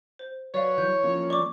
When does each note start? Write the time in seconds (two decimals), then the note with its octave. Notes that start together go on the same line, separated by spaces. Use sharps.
0.19 C5
0.54 F#3 B4 C#5 D5 F5
0.78 E3 G6
1.04 F3 A#3 C#4
1.30 D5 C#6 D6